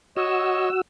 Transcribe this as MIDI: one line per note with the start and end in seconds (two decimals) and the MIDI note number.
0.17 0.81 66
0.17 0.69 73
0.17 0.69 75
0.17 0.81 88